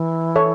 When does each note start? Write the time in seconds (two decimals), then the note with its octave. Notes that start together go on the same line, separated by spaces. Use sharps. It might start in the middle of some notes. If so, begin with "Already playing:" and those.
Already playing: E3
0.36 A4 C#5 E5